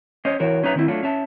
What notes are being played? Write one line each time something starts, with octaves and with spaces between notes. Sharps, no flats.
C#4 C5 C#5 D#5
E3 F#4 A#4 C#5
F#3 C#4 D#4 B4 E5 A#5
D#3 C4 E4
F#3 A3 D4 F4
C#4 E5 A5